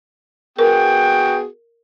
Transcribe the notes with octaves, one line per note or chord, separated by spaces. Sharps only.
B3 F#4 G#4 A#4 G5